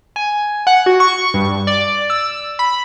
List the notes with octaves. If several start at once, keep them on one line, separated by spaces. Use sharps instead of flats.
G#5
F#5
F#4
C#6
G2
D5
E6
B5